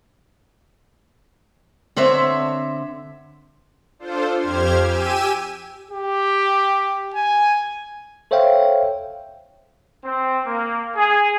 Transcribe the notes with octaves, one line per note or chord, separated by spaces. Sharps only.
D3 B3 C4 C#5 E5
D4 F4 A4 C5
F2 G4 C5 F6 G#6
G4 G#5 E6 D#7
G4
G#5
A4 C5 C#5 E5 F5 G5
C4
A#3
G#4